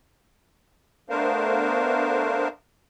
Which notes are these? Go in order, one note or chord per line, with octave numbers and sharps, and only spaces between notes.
A3 B3 D4 A#4 C5 F5